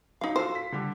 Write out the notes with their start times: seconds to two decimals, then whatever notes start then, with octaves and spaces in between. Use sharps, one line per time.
0.21 F#3 D#4 F5
0.36 F4 F#4 A4 C5
0.55 B6
0.72 D3 G3 G4